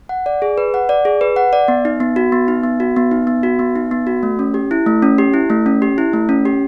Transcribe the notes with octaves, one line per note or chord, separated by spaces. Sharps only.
F#5
D5
G#4
B4
F#5
D5
G#4
B4
F#5
D5
B3
D#4
B3
F#4
B3
D#4
B3
F#4
B3
D#4
B3
F#4
B3
D#4
B3
F#4
A3
C#4
G4
E4
A3
C#4
G4
E4
A3
C#4
G4
E4
A3
C#4
G4